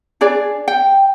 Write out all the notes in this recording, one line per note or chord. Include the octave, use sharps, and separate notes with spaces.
D4 G#4 D5
G5